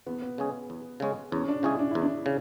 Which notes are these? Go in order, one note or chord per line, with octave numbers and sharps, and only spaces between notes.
E2 B3
B3
C#3 G#3 C#4 G#4
E2
C#3 G#3 C#4 G#4
E2 C#4
D4
C#3 G#3 C#4 E4 G#4
D4
E2 E4
D4
C#3